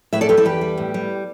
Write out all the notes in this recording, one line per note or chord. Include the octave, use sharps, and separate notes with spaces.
A2 B4 E5
A4 D5
G3 G4 B4
E4 A4
E2 G4 B4
G3
A2
G3